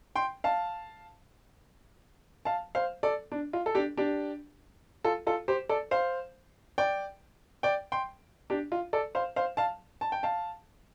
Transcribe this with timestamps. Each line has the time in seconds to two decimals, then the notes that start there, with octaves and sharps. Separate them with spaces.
0.16 G5 C6
0.44 F5 A5
2.45 F5 A5
2.75 C5 F5
3.03 A4 D5
3.32 D4
3.53 F4
3.66 A4
3.75 D4 G4
3.97 D4 G4
5.04 F4 A4
5.27 F4 A4
5.48 G4 C5
5.69 A4 D5
5.91 C5 F5
6.78 D5 G5
7.63 D5 G5
7.92 G5 C6
8.50 D4 G4
8.72 F4
8.93 A4 D5
9.15 C5 F5
9.36 C5 F5
9.57 F5 A5
10.01 A5
10.12 G5
10.23 F5 A5